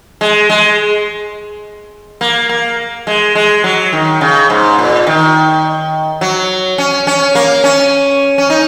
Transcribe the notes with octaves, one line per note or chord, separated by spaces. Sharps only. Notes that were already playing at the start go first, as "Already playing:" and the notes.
G#3
G#3
A#3
A#3
G#3
G#3
F#3
D#3
C#3
G#2
A#2
D#3
F#3
C#4
C#4
A#3
C#4
C#4
D#4